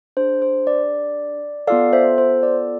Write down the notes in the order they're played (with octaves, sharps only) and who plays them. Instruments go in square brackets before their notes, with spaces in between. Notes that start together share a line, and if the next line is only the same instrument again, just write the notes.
[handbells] D4 G#4 C5
C5
D5
B3 F4 A4 D5 F5
C5 E5
C5
D5